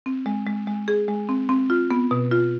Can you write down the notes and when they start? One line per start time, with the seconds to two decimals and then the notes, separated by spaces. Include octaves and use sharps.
0.06 C4
0.26 G#3
0.47 G#3
0.67 G#3
0.88 G#4
1.08 G#3
1.29 C4
1.49 C4
1.70 F4
1.91 B3
2.11 B2
2.31 F4